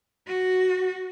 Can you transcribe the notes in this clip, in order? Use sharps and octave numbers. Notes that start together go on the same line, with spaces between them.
F#4